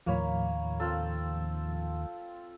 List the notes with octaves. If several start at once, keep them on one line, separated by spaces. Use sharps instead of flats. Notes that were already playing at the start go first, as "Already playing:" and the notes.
D#2 A2 F3 A#3 C#5 B5
C4 F4 A4